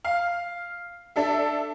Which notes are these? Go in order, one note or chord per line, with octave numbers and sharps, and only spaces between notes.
F5
D4 A4 E5